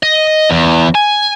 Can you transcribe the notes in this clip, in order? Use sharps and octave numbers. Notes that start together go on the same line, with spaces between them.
D#5
E2
G#5